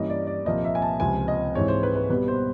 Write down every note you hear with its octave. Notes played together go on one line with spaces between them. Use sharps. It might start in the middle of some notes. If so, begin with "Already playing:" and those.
Already playing: G2 E3 G3 A#3 C#4 D#5
D5
D5
C2 A#2 F3 A#3 D#5
E5
G#5
A5
C#2 C3 F3 G#5
D#5
G#2 E3 G#3 C4 C#5
C5
B4
B4
B2 G3 B3 B4
C5